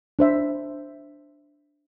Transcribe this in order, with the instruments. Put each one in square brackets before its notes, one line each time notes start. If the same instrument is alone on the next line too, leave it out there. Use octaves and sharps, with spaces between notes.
[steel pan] D4 C5 E5